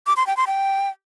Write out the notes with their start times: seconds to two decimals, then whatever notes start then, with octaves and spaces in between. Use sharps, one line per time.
0.07 D6
0.17 C6
0.27 G5
0.37 C6
0.47 G5